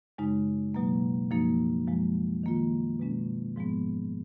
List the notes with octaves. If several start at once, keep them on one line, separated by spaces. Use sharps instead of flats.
F#2 C#3 G#3 D#4
B2 F#3 A#3
F#2 F3 A#3 D#4
F#2 F3 G#3
D#3 A#3 F4
B2 G#3 C#4
G#2 F3 G#3 B3